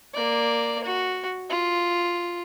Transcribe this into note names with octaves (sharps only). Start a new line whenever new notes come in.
A#3 D5
F#4
F4